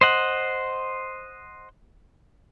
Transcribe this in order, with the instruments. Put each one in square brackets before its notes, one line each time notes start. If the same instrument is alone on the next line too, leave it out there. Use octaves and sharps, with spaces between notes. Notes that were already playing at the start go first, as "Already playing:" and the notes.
[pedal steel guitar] C5 D#5 F#5